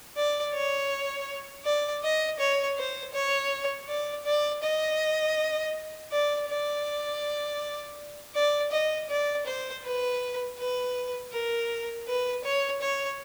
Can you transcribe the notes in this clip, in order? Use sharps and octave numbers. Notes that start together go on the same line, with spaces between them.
D5
C#5
D5
D#5
C#5
C5
C#5
D5
D5
D#5
D5
D5
D5
D#5
D5
C5
B4
B4
A#4
B4
C#5
C#5